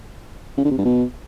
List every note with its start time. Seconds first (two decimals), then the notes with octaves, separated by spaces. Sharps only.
0.58 C#3
0.64 D3
0.71 C3
0.78 G2
0.85 B2